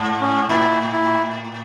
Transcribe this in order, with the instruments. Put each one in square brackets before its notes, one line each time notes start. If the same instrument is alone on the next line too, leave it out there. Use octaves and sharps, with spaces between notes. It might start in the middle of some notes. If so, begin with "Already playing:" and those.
Already playing: [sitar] G#2
[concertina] C#4
[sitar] A2 [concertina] E4
[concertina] E4